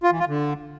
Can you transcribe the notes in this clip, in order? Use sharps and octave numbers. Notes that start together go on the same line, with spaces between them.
F4
E3
F4
D3